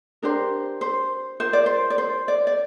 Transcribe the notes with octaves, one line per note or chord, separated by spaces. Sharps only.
D4 G4 A#4 C5
C5
F4 A#4 C5
D5
C5
D5
C5
D5
D5